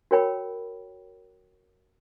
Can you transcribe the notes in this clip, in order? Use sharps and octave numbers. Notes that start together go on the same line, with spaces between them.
F#4 A#4 C#5 G5 B5